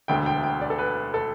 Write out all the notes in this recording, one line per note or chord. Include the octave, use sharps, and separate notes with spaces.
E1 D2 D3 A3 G5
G5
G5
D5
A4
B4
A4